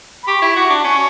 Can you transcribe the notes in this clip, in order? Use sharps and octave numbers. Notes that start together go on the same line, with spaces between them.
B5
G4 C#6
E4
F#4
D4
C#4 C#6